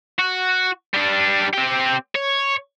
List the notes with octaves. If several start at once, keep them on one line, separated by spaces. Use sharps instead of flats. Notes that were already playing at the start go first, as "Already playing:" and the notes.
F#4
G3 D4
C4 G4
C#5